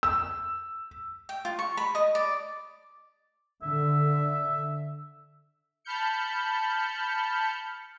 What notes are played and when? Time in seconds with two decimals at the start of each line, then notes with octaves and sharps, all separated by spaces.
0.03 E6
1.29 G5
1.45 F4
1.59 C#6
1.77 B5
1.95 D#5
2.15 D5
3.63 D3 E5
5.85 A5 B5 F6 G6 C#7